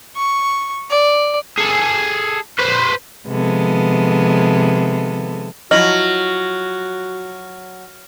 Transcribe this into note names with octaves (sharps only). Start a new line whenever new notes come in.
C#6
D5
G#4 A4
B4 C5
C3 D#3 F3 G#3 B3 A4
F3 F#3 E4 F#4 D#5 F6 A#6 F#7